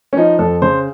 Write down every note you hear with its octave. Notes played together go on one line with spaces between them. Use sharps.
C#4
F3 D#4
F2 A4
C#3 C5